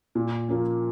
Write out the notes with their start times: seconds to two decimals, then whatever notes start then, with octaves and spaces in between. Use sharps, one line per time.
0.15 A#2
0.49 F3 A#3 C#4